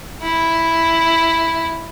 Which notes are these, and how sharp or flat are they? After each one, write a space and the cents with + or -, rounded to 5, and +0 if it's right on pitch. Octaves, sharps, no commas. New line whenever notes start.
E4 +0